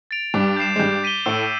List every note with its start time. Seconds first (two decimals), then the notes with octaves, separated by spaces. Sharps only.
0.11 A6 D7 F7
0.34 G2 G3 D6
0.57 G6 C7 E7
0.76 G#3
0.80 G2 G3 G6
1.04 B6 D#7 G7
1.26 A2 A3 E6